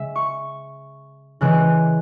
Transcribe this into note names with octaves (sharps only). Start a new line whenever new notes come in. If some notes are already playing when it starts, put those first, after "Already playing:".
Already playing: C#3 G#3 E5
C#6
C#3 E3 G#3 F#6